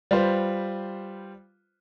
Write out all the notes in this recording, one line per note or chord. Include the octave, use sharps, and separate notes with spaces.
G3 F4 B4 C5